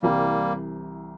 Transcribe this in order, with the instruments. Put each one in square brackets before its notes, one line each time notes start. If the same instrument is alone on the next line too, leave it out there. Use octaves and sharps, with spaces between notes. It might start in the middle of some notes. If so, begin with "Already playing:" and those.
[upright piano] C2 C3 E3 [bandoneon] G3 A#3